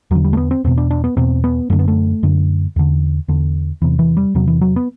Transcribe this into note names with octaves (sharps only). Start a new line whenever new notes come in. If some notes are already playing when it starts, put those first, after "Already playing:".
E2 D3 F#3
G3
A3
B3
C4
E2 B2 C4
D4
D4
B3
E2 B2 C4
B3
F#2 D3 A3
B3
A3
F#2 D3
E2 D3
E2 D3
E2 C3 E3
E3
G3
E2 C3 F#3
E3
F#3
B3